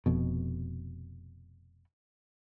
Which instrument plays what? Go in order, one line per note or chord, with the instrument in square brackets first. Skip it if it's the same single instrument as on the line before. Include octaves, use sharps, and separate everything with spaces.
[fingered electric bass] F1 F2 B2